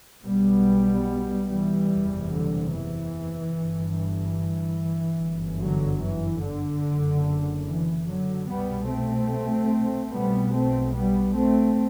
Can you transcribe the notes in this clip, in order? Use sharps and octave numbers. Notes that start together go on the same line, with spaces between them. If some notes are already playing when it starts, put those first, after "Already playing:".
B1 B2 G3 B3
E3 G3
F#1 E2 C3
D3
E3
G1 G2
E3
G1 F#2
D3 F#3
E3
D3
F#1 F#2
E3
D3 F#3
C2 B2 G3 B3
A3 C4
B1 B2 G3 B3
A3 C4
G3 B3
A3 C4